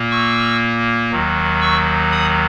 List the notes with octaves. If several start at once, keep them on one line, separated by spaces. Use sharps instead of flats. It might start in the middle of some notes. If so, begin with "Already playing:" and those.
Already playing: A#2 A#3
C#6 E6
D#2 D#3 F#3
C#6 E6
B5 D#6